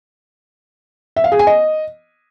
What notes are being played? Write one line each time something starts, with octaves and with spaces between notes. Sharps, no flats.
E5
F5
G#4
G#5
D#5